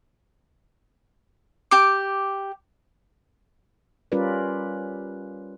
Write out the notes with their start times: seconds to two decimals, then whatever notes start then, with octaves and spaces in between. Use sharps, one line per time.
1.71 G4 D6
4.12 G3 C#4 F4 A#4 B4 D5